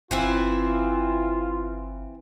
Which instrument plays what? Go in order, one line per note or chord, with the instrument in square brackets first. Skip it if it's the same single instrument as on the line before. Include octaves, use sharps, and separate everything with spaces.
[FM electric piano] G1 [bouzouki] E3 C4 E4 [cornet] F4